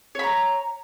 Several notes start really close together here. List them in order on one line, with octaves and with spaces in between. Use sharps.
C#5 B5 A#5